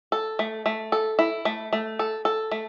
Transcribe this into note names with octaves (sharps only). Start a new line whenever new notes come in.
A4
A3
A3
A4
E4
A3
A3
A4
A4
A3